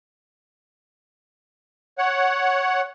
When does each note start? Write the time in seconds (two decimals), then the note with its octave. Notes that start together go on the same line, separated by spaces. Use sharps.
1.98 C#5 F#5